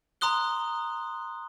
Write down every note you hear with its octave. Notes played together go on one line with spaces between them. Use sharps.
A#5 C6 D#6 F#6 G7